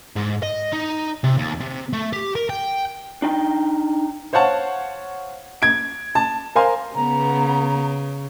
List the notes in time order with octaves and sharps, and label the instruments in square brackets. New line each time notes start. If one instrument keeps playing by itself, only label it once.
[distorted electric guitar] G#2
D#5
D#4
C3
D#2
C3
A3
G4
A#4
G5
[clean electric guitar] D4 D#4 G5
[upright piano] C5 C#5 F5 F#5 A5
G#6 D7
A5
A#4 C5 F5 G#5 C6
[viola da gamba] C#3 [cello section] B3 [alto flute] A#5